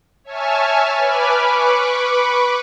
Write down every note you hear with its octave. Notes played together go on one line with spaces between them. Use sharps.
C#5 E5 G#5 A5 F6
B4 G#5 B5 D6 F6
B4 B5 C#6 D6